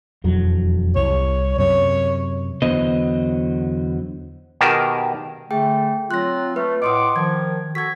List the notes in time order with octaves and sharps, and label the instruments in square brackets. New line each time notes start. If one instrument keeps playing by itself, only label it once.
[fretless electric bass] E1 F2 F#3
[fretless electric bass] C2 [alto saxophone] C#5
[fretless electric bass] F#2 C3 [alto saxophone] C#5
[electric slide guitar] E2 D3 F#3 B3 C5 D#5
[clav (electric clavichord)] B2 D#3 G4 G#4 A#4 A5
[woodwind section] D3 A3 [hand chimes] G#4 G5
[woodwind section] F#3 C4 F4 [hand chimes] F#6 A#6
[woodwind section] A3 [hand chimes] B4
[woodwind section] A2 F#5 D6 [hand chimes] D#5 C6 D#6
[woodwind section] D#3 F3 [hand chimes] G#6
[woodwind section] F#4 A4 [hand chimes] G#6 B6